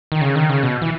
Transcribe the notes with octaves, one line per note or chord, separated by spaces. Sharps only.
D#3
C#3
D#3
C#3
B2
E3